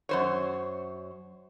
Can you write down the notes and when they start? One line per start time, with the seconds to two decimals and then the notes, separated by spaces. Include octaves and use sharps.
0.09 F#2 C5 C#5